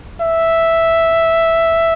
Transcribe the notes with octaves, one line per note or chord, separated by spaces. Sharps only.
E5